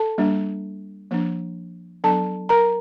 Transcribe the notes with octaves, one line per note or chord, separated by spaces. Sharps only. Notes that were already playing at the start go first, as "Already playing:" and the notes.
Already playing: A4 A5
G3 A#3 D4
F3 A#3 D4
F#3 B3 D4 A4 A5
A#4 A#5